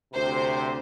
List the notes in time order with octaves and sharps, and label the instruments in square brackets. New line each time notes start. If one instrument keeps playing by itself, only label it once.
[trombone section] D2 C3 [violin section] C5